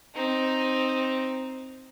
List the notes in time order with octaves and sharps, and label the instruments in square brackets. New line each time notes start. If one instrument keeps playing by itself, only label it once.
[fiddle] C4 D#4